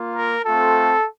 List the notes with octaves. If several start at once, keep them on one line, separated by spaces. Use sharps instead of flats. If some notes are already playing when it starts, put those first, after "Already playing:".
Already playing: A#3 F4
A#4
A3 C4 F4 A4